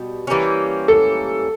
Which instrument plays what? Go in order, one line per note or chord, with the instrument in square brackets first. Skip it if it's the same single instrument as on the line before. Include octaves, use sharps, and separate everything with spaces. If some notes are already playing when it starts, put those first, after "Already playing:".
Already playing: [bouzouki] B2 G3 B3
E3 G3 A#3 C#4
[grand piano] A4